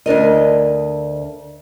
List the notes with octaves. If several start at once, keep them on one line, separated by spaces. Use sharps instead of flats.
D2 D4 A#4 D#5